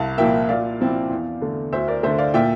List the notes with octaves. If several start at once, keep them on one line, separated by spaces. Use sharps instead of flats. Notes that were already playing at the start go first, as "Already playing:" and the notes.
Already playing: C2 F5 A5
A#2 F3 A#3 E5 G5
A#2 D5 F5
F3 C4 E4
E2
D3 A3
D2 C5 E5
A#4 D5
D3 A3 C5 E5
D5 F5
A#2 E5 G5